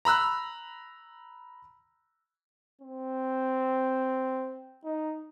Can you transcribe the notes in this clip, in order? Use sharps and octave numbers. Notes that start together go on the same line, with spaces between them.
A#5 B5 E6 F#6
C4
D#4